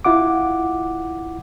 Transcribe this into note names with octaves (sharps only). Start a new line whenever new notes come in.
E4 F4 F#5 D6